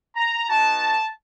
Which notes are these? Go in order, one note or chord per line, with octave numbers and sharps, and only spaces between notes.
A#5
B3 D#4 F#4 A5